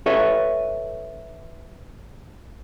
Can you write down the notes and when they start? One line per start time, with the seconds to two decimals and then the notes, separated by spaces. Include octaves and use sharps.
0.06 A4 B4 C#5 E5